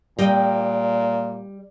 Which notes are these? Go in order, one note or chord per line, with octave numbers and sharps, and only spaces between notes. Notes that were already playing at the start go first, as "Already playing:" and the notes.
A#2 G3 D#5 G5 A#5